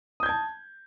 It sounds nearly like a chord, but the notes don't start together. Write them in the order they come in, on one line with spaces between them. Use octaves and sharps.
D#6 G6 G#6 A5